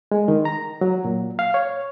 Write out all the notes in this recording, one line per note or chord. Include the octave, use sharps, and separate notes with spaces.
G#3
D#3
A#5
F#3
A#2
F5
C#5